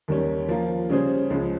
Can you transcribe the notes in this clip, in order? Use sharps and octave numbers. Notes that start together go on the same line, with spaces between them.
D#2 D#3 G3 C#4
F3 A#3 F4
C#3 G3 C#4 G#4 C5
C#2 C#3 F3 G#3